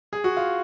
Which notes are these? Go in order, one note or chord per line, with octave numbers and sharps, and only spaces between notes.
G#4
F#4
F4